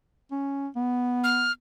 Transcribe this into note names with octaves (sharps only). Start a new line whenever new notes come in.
C#4
B3
F6